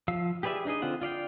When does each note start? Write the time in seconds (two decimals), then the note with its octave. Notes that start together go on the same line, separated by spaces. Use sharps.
0.08 F3 F5 E6
0.43 G4 G#4 B4 D5 E5
0.65 D4 D#4 G#4 D#5
0.82 D3 C4 F4 F#5
1.01 F4 D5 F5 G5